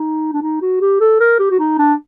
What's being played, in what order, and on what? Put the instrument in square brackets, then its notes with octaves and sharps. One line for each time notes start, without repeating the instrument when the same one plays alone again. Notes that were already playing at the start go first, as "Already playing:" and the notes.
Already playing: [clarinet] D#4
D4
D#4
F#4
G4
A4
A#4
G4
F#4
D#4
D4